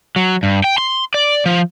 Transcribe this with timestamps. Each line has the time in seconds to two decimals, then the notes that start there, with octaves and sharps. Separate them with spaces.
0.16 F#3
0.43 G2
0.64 G5
0.78 C6
1.14 D5
1.46 F3